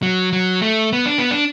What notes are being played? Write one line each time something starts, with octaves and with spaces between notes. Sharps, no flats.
F#3
F#3
A3
B3
D4
B3
D4